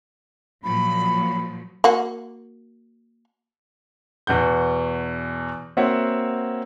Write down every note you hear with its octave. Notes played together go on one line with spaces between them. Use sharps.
A#2 F3 F#3 B5
A#3 F#4
E2 B2 F#5 G6
A#3 C4 F#4 C#5 E5 F#5